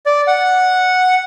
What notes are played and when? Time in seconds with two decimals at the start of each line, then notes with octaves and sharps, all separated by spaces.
0.06 D5
0.28 F#5